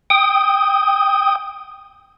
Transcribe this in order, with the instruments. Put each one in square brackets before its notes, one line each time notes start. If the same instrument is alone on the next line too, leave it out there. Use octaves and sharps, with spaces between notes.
[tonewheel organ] G5 D#6